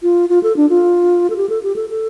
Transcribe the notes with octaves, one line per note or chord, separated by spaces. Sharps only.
F4
F4
A4
D4
F4
A4
G4
A4
G4
A4
A4